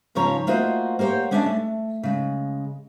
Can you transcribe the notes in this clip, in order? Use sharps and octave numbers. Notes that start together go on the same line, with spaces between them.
G#2 C#3 F3 C#5 A#5
A3 A#3 F4 F#4 C5 D#5
A#3 G4 C5 C#5 F#5
G#3 C#4 D4 E5 F#5 A5
A3
C#3 G#3